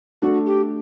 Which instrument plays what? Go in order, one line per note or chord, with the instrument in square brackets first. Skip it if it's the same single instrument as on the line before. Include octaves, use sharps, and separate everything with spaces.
[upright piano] A3 D4 A4 D5 [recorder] F#4
[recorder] G4